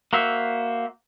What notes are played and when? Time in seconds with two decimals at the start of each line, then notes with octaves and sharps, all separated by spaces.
0.13 A#3 F#4 C5 E5